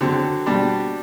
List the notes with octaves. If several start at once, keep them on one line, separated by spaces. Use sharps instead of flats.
D3 F#3 C4
B2 G3 D4